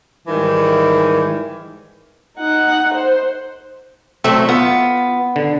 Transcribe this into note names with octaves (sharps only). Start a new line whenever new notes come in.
G#2 D#3 E3 G3
D#4 F#5
C5
F#3 A3 C4
B3 F4
D3